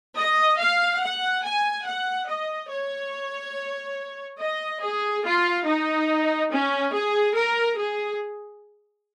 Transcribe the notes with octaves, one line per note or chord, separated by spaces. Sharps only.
D#5
F5
F#5
G#5
F#5
D#5
C#5
D#5
G#4
F4
D#4
C#4
G#4
A#4
G#4